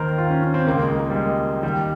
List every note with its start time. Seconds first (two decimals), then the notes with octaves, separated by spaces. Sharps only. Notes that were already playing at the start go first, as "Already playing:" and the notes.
Already playing: D#2 D#3 A#4 C5
0.18 F4
0.30 C#4
0.43 C#4
0.54 C4
0.67 C#2 C#3 A#3
0.83 G#3
0.99 A#3
1.10 G3
1.15 G#3
1.63 D#2 D#3 G3